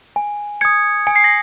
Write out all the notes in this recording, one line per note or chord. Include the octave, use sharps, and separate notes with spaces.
G#5
D#6 G#6 C#7
G#5 C#7
C7
A#6